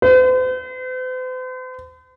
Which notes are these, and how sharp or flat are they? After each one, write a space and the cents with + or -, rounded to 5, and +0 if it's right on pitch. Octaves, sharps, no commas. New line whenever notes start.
C5 -45